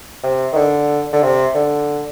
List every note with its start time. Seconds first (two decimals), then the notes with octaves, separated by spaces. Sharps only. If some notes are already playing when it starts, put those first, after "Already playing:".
0.23 C3
0.52 D#3
0.56 D3
1.13 D3
1.23 C3
1.55 D3